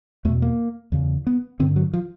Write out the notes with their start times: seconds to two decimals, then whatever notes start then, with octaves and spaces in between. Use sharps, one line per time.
0.25 E2 A3
0.29 B2
0.42 A#3
0.92 E2 C#3
1.27 B3
1.60 G2 D3 C4
1.76 F#3
1.93 F3